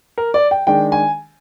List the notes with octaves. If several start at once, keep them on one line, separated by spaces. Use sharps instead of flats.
A#4
D5
G5
D#3 G#3 D4 G5
G#5